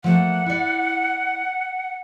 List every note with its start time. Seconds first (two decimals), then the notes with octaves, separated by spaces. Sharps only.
0.04 F3 A3 A#3 F#5
0.46 E4 D5